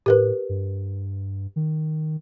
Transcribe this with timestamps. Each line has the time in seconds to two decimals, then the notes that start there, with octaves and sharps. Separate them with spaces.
0.06 A2 G4 A#4 B4
0.49 G2
1.56 D#3